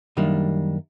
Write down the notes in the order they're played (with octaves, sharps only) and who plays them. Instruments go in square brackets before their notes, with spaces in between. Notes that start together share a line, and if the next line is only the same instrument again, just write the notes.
[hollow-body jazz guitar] F#2 D#3 G3 A#3 D4